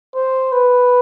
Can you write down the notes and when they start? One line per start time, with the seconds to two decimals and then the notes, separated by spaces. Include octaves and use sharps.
0.15 C5
0.52 B4